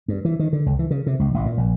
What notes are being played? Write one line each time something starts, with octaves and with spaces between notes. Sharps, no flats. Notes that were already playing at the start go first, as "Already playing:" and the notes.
G2
E3
D#3
D3
C#2
E3
C#3
C3
C#2
A1
A#2
A#1